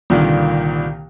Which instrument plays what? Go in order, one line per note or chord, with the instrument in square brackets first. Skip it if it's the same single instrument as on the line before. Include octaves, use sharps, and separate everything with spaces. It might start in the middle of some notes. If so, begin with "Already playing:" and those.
[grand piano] C2 A#2 D3 D#3 A#3